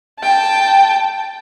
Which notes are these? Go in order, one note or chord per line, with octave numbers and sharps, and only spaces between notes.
G5 A5